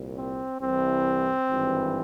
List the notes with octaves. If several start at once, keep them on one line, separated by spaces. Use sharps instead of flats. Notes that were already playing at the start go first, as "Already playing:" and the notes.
Already playing: C2 A#2
C4
C2 C3 E3 C4
G#1 G2 E3